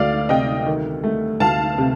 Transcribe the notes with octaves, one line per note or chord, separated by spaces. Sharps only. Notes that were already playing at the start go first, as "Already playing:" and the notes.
Already playing: D2 A3 D5 F5
C3 D#5 G5
D#3
A3
D2 F5 A5
C3